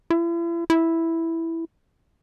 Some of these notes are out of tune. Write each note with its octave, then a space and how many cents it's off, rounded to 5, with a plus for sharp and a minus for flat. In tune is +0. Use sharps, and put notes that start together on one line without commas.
E4 +40
E4 +0